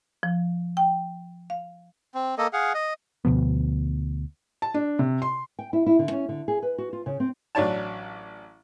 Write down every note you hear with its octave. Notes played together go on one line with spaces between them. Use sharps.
F3
G5
F5
C4
A#3 A4 D#5
G#4 F5 F#5
D#5
D2 B2 F3 B3
A5
D4
C3
C6
G5
E4
E4
D3
C#4
D3
G#4
B4
F#4
F4
C#3
C4
A1 F#3 D4 C#5 D5 A5